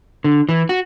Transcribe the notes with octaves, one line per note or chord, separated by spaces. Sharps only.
D3
E3
F#4